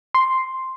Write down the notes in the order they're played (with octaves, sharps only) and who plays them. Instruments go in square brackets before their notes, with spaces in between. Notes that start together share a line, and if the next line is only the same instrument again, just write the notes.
[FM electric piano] C6